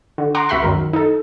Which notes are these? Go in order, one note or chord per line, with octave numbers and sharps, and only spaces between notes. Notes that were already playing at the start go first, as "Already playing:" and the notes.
D3
F#5 A#5 C6 D6
C#2 F#4 E5 F#5 B5 C6
F#2 D#3 A#4
D#4 A4